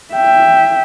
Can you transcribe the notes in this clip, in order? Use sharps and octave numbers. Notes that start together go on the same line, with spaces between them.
E5 G5